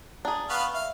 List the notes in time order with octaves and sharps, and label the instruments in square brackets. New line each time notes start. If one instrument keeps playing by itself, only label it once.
[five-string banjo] D4 G#4 [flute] A#5
[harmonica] B3 B4 F5 [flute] C#6
[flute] E5 [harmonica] F5